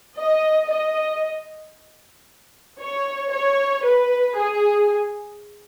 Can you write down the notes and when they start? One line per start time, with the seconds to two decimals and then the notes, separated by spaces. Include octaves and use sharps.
0.17 D#5
0.70 D#5
2.79 C#5
3.32 C#5
3.84 B4
4.36 G#4